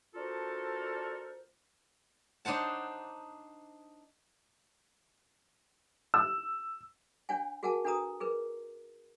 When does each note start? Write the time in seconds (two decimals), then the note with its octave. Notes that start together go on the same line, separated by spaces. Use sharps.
0.15 D4 F4 F#4 A4 A#4 C5
2.45 D4 D#4 C5 F#5 A5
6.14 E6
7.29 D4 C#5 F#5 G#5
7.63 F#4 G#4 A#4 F#5 G#5 A5
7.85 D4 F#4 A4 B4 A#5 D#6
8.20 G#4 A#4 B4